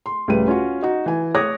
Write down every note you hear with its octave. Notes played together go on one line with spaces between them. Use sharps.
C6
C#2 A2 G3 B4 D#7
C#4 F4 F#4
D#4 F#4
E3 G#5
C#5 D6 D#6 F#6 G#6 A#6